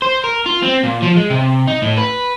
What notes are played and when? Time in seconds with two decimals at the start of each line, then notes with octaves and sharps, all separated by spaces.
0.02 C5
0.24 A#4
0.46 F4
0.63 C4
0.84 A#2
1.03 F3
1.17 G#3
1.30 C3
1.67 D#4
1.82 A2
1.98 B4